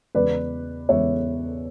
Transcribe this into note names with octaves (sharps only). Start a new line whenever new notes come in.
E2 C#3 G#3 B4 D5
E2 C#3 G#3 C#5 E5